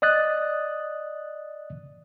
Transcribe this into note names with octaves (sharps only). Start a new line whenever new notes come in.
D5 D#5 D#6 F#6 A6